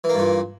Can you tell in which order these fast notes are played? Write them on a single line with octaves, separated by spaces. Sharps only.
E3 A#3 G2 A#2